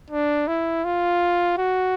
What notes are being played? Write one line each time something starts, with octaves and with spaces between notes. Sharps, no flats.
D4
E4
F4
F#4